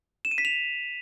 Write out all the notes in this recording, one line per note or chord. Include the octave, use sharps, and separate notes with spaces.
E7
D#7
B6
F7